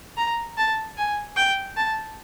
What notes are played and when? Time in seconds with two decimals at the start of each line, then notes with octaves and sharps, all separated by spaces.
0.17 A#5
0.57 A5
0.98 G#5
1.36 G5
1.77 A5